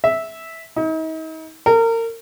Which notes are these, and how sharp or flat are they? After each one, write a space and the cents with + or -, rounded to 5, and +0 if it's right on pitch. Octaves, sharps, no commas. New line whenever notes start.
E5 -10
D#4 +40
A#4 -30